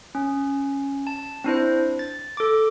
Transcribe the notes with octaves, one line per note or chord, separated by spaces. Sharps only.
C#4
A5
C4 D4 E4 C5
A6
A4 D6